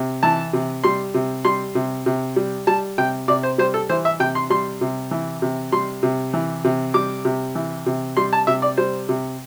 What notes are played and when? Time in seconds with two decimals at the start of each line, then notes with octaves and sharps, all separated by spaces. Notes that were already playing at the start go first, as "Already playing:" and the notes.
Already playing: C3
0.23 E3 A5
0.53 C3
0.84 G3 C6
1.14 C3
1.45 G3 C6
1.75 C3
2.06 C3
2.36 G3
2.67 G3 A5
2.98 C3 G5
3.28 C3 D5
3.43 C5
3.58 G3 C5
3.74 A4
3.89 E3 C5
4.05 E5
4.20 C3 G5
4.35 C6
4.50 G3 C6
4.81 C3
5.11 E3
5.42 C3
5.72 G3 C6
6.03 C3
6.34 E3
6.64 C3
6.94 G3 D6
7.25 C3
7.55 E3
7.86 C3
8.17 G3 C6
8.33 A5
8.47 C3 E5
8.62 D5
8.77 G3 C5
9.09 C3